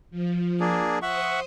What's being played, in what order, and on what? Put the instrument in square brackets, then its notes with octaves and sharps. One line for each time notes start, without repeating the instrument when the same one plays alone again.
[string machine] F3
[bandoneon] A#3 D4 G#4
[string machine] C5 D#6 [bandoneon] E5 F#5 C#6